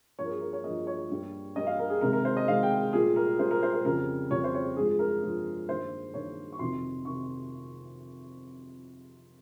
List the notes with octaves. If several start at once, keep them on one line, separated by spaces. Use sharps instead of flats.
G2 F3 A#3 C#5
A#4
G#4
A#4
C#5
G2 F3 A#3 D#5
C#5
G2 G3 A#3
G2 G3 A#3 D#5
F5
A#4
G#4
C3 D#3 G#3 A#4
A#4
C5
D#5
C3 D#3 G#3 F5
G5
A#2 G3 A#3 G#4
A#4
A#2 G3 A#3 C5
A#4
C5
A#4
F2 C#3 G3 A#4
F2 C#3 G3 C#5
C5
C#5
G2 F3 G#3 G#4
A#4
G2 F3 G#3
G2 D#3 A#3 C5
G2 D#3 A#3 C#5
C#6
F2 C3 D#3 C6
C3 D#3 C#6